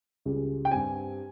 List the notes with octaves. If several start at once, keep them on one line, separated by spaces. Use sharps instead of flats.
C#2 C#3 G3
G5
G2 G3 C4 G#5